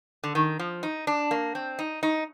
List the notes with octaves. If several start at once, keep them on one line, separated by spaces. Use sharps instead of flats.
D3
D#3
F3
D#4
D4
A#3
C4
D#4
D#4